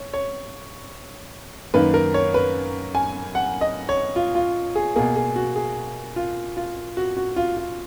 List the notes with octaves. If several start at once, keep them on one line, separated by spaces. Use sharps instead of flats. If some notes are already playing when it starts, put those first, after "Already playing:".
Already playing: C#5
C#5
F#2 D#3 A#3 B4
A#4
C#5
B4
G#5
F#5
D#5
C#5
F4
F4
G#4
B2 A#3 G#4
G#4
F#4
G#4
F4
F4
F#4
F#4
F4
F4